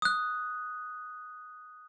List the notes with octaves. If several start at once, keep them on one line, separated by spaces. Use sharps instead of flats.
D#6 F#6